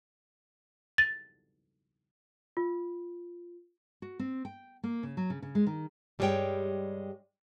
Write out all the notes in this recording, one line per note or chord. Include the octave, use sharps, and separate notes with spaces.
A6
F4
F#4
C4
G5
A#3
C#3
F#3
C#3
C#3
G#3
D#3
G2 G3 G#3 F4 C#5 G5